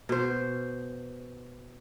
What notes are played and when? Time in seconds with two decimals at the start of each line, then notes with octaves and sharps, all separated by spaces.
0.09 B2 C5